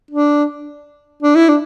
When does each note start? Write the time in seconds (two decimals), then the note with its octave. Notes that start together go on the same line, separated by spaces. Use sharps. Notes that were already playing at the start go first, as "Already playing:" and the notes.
0.11 D4
1.22 D4
1.35 E4
1.49 D4